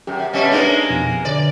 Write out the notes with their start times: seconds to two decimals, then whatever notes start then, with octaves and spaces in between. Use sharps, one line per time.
0.07 F#2 G4 G5
0.33 B2 G3 C#4 D#5 E5
0.52 G#3 A#3 B3 D4 D#4
0.90 F2 B2
1.25 D3 D5